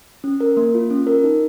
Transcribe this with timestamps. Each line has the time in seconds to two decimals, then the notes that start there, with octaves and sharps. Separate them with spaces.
0.24 C#4
0.40 A#4
0.57 A#3
0.74 F4
0.90 C#4
1.07 A#4
1.24 D#4